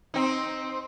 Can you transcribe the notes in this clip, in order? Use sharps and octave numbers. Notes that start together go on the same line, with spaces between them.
C4 D#4